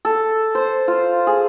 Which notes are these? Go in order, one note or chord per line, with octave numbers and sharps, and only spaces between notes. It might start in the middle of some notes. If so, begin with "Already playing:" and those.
A4
C5
F4
G#4